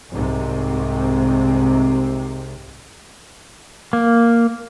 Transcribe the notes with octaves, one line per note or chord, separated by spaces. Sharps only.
C2 G#2 C3 C4
A#3